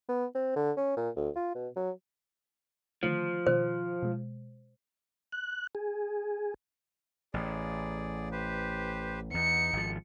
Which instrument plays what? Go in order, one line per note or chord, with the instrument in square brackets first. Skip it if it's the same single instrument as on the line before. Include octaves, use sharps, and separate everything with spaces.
[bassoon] B3
C4
D3
C#4
A#2
D2
F4
B2
F#3
[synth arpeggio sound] D3 D#3 A3 [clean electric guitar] F3
[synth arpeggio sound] B2 D#3 F4 [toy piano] C5
[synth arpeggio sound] B2 G#3
[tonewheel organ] F#6
G#4
[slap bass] A1 [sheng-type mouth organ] G#4 D5
[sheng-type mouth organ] G4 B4 C5
[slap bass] E2 [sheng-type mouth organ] D#4 [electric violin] C#7
[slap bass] G#1 F3